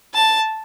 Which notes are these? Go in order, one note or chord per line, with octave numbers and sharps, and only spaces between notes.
A5